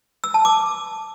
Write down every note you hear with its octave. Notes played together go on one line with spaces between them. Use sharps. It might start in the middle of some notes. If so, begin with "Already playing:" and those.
E6
A5
D6